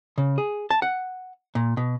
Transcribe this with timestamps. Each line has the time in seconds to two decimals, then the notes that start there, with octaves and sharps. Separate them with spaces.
0.18 C#3
0.38 G#4
0.70 A5
0.82 F#5
1.55 A#2
1.77 B2